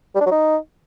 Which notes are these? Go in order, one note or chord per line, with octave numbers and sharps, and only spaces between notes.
G3
D4
F#3
D#4